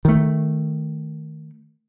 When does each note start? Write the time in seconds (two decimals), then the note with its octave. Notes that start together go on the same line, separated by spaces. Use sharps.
0.05 D#3 A3